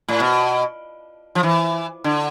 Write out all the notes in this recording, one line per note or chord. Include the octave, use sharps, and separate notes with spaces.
A2
B2
F3
E3
D3